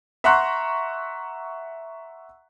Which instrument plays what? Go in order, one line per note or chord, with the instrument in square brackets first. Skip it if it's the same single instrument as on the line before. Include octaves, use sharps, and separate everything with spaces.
[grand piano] E5 F#5 A#5 C6 C#6 F#6